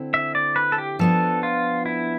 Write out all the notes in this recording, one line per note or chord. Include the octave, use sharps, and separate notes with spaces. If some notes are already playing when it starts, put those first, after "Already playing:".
Already playing: D3 C4 E4
E5
D5
B4
A4
G4
F3 B3 D4 A4
F4
E4